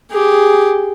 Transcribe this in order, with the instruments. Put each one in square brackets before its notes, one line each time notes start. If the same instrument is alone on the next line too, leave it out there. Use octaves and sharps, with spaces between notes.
[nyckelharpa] G4 G#4